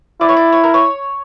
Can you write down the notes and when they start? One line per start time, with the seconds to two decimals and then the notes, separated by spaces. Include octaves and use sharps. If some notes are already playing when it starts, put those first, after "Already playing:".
0.21 E4 D5
0.29 C#5
0.36 D5
0.52 C#5
0.64 A#4
0.74 C#5